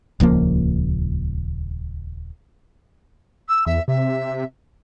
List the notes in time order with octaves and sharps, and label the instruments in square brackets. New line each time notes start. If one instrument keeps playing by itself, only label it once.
[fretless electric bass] D#1 C#2 F3 A#3
[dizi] E6
[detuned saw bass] E2 [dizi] E5
[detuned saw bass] C3 [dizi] E5